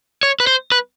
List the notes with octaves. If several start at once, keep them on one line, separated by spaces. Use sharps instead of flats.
C#5
B4
C5
B4